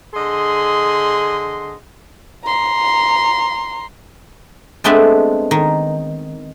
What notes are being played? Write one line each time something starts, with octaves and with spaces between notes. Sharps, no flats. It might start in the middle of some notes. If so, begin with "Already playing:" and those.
D3 G#4 D#5 C6
A#5 C6
G#3 A3 B3 C4 D4 E5
D#3